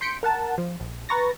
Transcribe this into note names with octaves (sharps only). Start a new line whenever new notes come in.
C6 G6 B6 C#7 D7
A#4 F#5 A5
F3
A#1
B4 A#5 C#6 A6 A#6